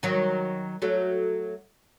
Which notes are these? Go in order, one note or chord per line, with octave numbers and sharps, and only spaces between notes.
D#3 F#3
F#3 A3